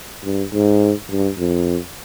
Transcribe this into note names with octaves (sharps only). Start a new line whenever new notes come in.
G2
G#2
G2
F2